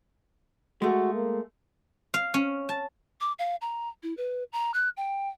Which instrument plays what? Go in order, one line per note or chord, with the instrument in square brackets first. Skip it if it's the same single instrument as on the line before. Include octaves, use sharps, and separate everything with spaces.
[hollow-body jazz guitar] G#3 A3 [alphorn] F#4
[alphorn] A#3
[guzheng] F5
C#4
A5
[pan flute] D6
F5
A#5
E4
B4
A#5
F#6
G5